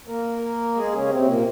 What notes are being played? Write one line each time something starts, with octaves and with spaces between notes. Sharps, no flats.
A#3 A#4
G#3 G#4
C#3 C#4
C3 C4
A#2 A#3